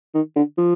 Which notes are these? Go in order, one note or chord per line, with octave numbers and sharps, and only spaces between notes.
D#3
D3
F3